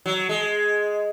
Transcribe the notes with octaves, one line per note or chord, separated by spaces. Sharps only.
F#3
G#3